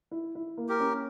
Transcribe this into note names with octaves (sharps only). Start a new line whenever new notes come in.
E4
E4
A#3
G4 A#4
C#4